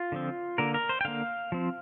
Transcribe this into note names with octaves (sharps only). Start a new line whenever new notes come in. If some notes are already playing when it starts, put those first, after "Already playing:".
Already playing: F4
D3 F3 C4
D3 A#3 A#4
A#4
C5
G5
D3 A#3 F5
F3 C4